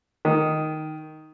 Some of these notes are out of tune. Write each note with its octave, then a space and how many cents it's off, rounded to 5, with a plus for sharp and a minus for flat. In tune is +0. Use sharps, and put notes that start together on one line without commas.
D#3 +0